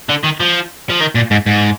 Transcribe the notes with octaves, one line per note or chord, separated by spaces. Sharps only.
D3
D#3
F3
F3
D#3
A#2
G#2
G#2